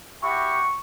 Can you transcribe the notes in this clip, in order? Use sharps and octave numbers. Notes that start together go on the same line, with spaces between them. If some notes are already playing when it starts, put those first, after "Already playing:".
E4 F#4 G4 C#6